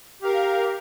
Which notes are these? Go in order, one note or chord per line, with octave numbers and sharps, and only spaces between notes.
G4 A#4 F5